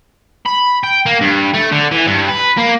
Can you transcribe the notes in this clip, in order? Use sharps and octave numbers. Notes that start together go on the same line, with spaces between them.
B5
G5
A#3
G2
A3
D3
E3
G2
B4
A#3